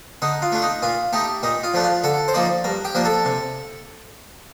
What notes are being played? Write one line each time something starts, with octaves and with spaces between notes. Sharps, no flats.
D3 D#4
F4
A3 D4
D#4
A#2 F4
A3 D#4 G4
A#2 D#4
F4
F3 A3 D4
F4
D3 A4
C5
F3 A#3 D#4 D5
G2 A#4
G4
F3 A#3 D4
A4
C3